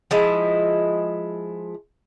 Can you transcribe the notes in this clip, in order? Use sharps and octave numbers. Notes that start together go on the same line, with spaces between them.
F3 G#3 E4